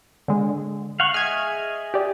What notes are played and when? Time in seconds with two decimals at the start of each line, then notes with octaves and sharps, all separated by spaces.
0.28 D3 G#3
1.00 F5 F#5 C#6
1.14 G#4 D#5 E5 F6 G#6
1.94 G4 D5